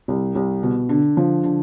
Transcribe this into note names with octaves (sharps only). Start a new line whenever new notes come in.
C2
C2
B2
D3
F3
D3